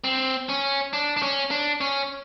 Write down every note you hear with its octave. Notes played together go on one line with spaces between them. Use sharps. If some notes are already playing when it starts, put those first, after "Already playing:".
C4
C#4
D4
D4
C#4
D4
C#4